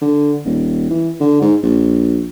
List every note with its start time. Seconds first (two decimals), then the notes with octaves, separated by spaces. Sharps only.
0.01 D3
0.45 D#1
0.90 E3
1.20 D3
1.41 G#2
1.63 A#1